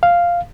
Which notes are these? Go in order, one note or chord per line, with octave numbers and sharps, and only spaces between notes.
F5